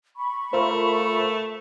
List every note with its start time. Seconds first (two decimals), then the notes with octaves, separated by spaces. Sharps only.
0.16 B5 C#6
0.53 A3 F4 A#4 C5 E5